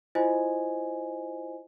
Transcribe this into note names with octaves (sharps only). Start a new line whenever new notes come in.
E4 F4 C5 D#5 G#5